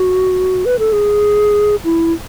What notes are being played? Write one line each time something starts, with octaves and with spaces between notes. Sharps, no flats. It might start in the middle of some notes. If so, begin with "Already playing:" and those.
Already playing: F#4
B4
A4
G#4
E4